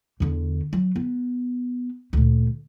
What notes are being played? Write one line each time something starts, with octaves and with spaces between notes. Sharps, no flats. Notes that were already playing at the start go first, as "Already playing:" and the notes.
E2 D3
F#3
B3
D2 A#2